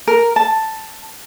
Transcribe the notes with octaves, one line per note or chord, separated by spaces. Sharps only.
A#4
A5